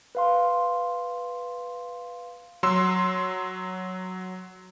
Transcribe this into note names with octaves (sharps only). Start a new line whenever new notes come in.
B4 F5 C6
F#3 C6 E6